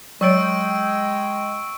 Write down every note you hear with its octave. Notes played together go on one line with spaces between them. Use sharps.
F#3 G#3 C#5 G5 C#6 E6 D7